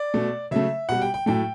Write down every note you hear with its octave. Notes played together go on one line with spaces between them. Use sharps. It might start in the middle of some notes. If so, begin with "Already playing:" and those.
Already playing: D5
B2 A3
C#3 F#3 A3 E5
B2 G3 F#5
G5
G5
A2 F#3 A3 G5